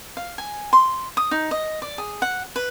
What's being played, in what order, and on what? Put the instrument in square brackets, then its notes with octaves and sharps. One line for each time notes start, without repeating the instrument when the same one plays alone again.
[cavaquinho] F5
G#5
C6
D#6
D#4
D#5
D5
G#4
F#5
B4